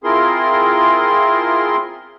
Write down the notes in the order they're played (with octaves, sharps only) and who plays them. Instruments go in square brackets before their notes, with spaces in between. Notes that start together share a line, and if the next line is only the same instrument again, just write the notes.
[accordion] C4 E4 F4 G#4 A#4 C6